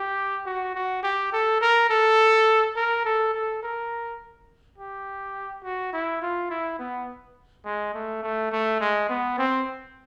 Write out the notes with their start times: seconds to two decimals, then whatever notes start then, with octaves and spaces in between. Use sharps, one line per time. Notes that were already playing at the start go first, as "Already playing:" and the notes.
Already playing: G4
0.46 F#4
0.74 F#4
1.03 G4
1.32 A4
1.61 A#4
1.90 A4
2.76 A#4
3.05 A4
3.34 A4
3.63 A#4
4.78 G4
5.64 F#4
5.93 E4
6.22 F4
6.50 E4
6.79 B3
7.65 G#3
7.94 A3
8.23 A3
8.51 A3
8.80 G#3
9.09 B3
9.38 C4